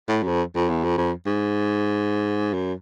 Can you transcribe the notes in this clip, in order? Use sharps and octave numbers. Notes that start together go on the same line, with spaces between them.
A2
F#2
F2
F2
E2
F2
F2
G#2
F#2